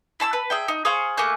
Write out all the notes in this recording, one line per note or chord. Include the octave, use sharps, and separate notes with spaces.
E4 A5 C6 E6
B4
G#4 E5 G5
D#4
G#4 C5 F5 C#6
A3 A#3 G#4 F#6